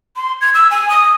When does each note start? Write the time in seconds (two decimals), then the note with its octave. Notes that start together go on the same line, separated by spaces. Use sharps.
0.16 C6
0.41 G#6
0.54 E6
0.71 G#5
0.90 D#6